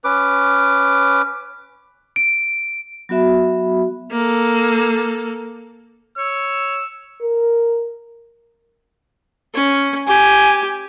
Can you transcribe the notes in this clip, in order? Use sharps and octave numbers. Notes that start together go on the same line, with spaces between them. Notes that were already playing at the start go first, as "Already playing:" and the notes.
C#4 B4 D6
D7
F#3 B3 F#4 E5 B5
A#3 A4
C#5 E6
A#4
C#4
G4 G#5